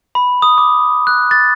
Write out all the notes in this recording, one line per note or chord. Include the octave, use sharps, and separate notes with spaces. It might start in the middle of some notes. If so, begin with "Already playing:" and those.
B5
D#6
D6
F#6
A6